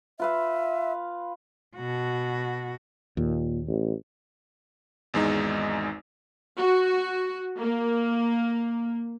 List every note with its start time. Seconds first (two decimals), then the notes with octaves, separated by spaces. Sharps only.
0.20 F4 B4 E5 F5
1.77 B2 F#4
3.17 D#2 A#2
3.68 A1
5.14 G#1 E2 G#3 D#4
6.58 F#4
7.58 A#3